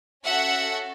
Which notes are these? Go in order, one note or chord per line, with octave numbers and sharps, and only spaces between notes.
C#4 F#4 A4 E5 F#5